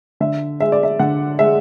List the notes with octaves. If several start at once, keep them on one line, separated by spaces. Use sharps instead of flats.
D3 E5
G#3 E5
D5
E5
D3 F#5
G#3 E5